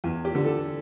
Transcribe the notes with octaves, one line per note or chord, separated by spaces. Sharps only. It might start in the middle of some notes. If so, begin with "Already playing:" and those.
E2
G4
D3
A4